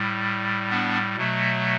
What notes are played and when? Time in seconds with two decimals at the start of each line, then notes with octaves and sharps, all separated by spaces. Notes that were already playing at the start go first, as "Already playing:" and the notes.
Already playing: A2 G3
0.70 B3 D4
1.16 B2 F#3 A3